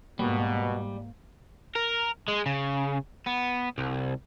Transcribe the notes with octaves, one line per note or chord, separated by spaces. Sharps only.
G#2 B2 G3 A#3
A#4
G#3
C#3
B3
C2